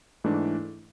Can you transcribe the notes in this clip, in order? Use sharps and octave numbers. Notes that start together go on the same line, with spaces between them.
G#2 E3 A3 D4